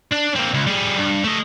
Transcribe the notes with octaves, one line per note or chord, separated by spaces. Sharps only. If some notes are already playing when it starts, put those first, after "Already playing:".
D4
A#3 C4
C#2
G3 G#4
G2
A3 D#5